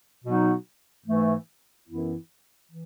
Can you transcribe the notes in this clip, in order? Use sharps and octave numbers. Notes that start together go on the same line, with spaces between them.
B2 F#3 B3 D#4 F#4
G#2 E3 A3
F#2 E3 B3 E4
E3